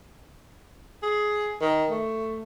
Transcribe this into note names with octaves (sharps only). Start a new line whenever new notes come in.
G#4
D#3
A3